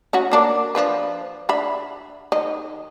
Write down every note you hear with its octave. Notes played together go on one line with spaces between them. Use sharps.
C#4 D#4 F#4
A#3 D4 A#4
F3 D4 B4
D4 E5 B5
D#3 D#5